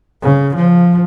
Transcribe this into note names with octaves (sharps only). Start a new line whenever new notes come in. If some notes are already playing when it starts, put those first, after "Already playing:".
C#3
F3